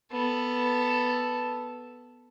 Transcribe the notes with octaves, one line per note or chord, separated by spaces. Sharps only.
B3 A4